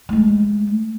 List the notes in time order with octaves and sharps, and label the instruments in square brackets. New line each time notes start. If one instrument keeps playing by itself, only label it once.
[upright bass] G#3 A3